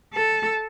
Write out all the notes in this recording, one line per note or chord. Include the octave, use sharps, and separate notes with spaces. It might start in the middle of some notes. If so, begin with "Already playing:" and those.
A4